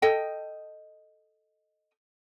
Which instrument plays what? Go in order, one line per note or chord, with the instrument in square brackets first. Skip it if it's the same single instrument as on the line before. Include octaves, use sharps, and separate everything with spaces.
[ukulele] A4 D#5 G5